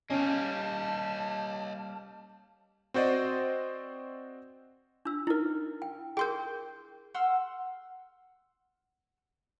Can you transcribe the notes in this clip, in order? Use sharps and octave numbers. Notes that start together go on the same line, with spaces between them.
G3 A#3 C#4 C#5 D#5 A5
C4 F#4 C5 D5 D#5
D4 E6
D#4 E4 A#4
G5
G#4 A#4 G5 C6 G6
F#5 C6 E6 F6